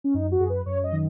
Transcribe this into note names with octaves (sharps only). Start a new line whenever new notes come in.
C#4
F#2 D#4
F#4
F#2 G#4
B4
F#2 C#5
D#5
D#3